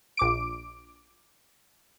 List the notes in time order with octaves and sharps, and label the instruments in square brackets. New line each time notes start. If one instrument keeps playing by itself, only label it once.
[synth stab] A#1 D6 D7